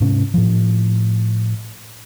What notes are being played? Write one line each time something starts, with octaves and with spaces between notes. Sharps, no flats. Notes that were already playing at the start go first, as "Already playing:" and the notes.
G#2 C3 C#4
A2 F3